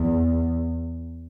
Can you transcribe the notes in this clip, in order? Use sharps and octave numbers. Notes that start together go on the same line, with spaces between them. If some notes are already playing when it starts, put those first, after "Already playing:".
Already playing: E2